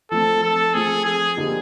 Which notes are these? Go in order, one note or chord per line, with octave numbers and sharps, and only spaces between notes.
F3 A3 C4 A4
A4
F3 A3 C4 G#4
G#4
D3 F3 A#3 D#4 G4